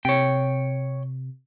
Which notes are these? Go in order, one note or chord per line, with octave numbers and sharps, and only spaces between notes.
C3 C#5 G5